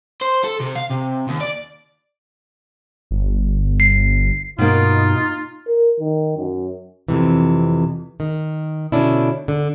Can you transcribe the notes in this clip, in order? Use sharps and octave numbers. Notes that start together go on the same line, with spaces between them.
C5
A4
C3
F5
C3
D#2
D5
G1
C7
G2 B2 A#3 D#4 F4
A#4
D#3
F#2
F2 A2 C3 E3
D#3
B2 D3 C#4 D4 E4
D3